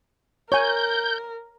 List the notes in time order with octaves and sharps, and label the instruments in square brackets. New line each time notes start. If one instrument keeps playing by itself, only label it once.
[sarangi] A#4 [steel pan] C#5 G#5 [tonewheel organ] G6